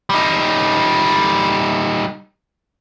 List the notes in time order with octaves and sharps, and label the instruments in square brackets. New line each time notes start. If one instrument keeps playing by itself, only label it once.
[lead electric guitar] G3 D#4